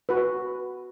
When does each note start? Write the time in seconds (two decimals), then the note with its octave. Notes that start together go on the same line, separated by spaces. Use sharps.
0.09 F#4 B4